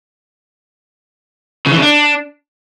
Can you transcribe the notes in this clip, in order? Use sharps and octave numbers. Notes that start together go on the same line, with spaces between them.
C#3
E3
C#3
D4